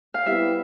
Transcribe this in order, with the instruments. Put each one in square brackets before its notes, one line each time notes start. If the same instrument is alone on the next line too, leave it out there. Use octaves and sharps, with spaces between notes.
[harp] F5
[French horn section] G3 B3 E4 G4 [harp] E5